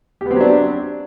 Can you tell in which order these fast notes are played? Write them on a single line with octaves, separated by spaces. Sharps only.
G4 B3 C4 F#3 D4